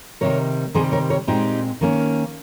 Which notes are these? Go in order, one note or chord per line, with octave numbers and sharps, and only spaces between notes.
C3 D#3 G3 A#4 C#5
C3 D#3 G3 C4 G#4 C5
A#4 C#5
A#4 C#5
A#2 G#3 C4 D#4 G4
D#3 A#3 C#4